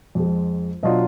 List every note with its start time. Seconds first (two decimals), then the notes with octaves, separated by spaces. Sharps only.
0.15 F2 F3 G#3
0.83 B2 F#3 D4 F4 D#5